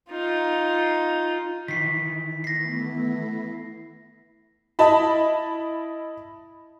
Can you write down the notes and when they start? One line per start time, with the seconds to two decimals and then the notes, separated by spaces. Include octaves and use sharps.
0.10 D#4 F4
1.68 D#3 E3 B6 C7
2.44 A3 B3 E4 A#6 C7
4.79 E4 D#5 A5 B5